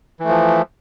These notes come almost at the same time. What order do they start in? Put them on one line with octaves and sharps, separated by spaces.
E3 A3 F3